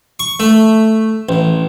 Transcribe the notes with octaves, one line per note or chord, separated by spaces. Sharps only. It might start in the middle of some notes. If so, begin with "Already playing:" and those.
C#6
A3
A1